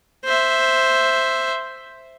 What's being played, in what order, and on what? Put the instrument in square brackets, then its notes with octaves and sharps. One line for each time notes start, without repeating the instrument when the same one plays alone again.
[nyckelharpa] C5 E5